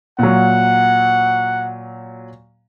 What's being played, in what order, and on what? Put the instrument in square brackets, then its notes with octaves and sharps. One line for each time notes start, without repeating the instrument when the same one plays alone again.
[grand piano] A#2 F#3 [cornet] F#5